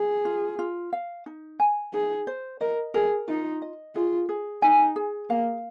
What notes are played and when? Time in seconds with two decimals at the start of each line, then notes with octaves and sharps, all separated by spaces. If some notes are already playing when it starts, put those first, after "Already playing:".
Already playing: G#4
0.25 F4
0.59 F4
0.93 F5
1.26 D#4
1.60 G#5
1.93 D#4 G#4
2.27 C5
2.61 A#4 D#5
2.94 G#4 A#4
3.28 D#4 F4
3.62 D#5
3.95 F4 G#4
4.29 G#4
4.62 D#4 G#5
4.96 G#4
5.30 A#3 F5